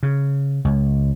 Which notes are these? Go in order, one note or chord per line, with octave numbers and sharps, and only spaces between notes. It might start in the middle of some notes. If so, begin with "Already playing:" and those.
C#3
C#2